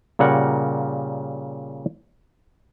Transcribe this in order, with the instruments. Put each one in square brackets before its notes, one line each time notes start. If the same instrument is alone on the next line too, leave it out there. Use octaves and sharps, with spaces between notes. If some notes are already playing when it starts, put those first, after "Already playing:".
[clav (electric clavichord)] A#2 C#3 G3 A#4 F#5